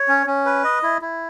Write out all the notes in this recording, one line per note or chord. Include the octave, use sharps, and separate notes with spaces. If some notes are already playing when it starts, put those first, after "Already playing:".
Already playing: C#5
C#4
C#4
B4
D#5
E4
E4